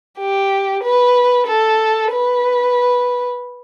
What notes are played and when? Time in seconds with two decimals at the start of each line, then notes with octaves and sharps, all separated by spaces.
0.19 G4
0.83 B4
1.47 A4
2.11 B4